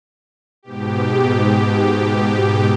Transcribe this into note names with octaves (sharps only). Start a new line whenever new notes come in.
G#2 B2 G4